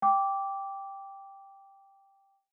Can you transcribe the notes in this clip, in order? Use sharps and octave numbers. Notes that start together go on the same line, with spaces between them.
G5 D6